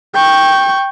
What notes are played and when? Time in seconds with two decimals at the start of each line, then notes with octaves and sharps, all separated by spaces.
0.15 G5 C#6